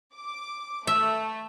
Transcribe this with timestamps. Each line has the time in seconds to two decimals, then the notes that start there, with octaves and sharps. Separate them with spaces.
0.15 D6
0.87 A3 E5